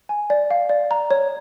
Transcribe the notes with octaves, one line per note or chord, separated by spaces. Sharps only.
G#5
D5
F5
D5
A#5
C#5